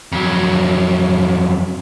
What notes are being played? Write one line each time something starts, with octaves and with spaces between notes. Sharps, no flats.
F2 F#3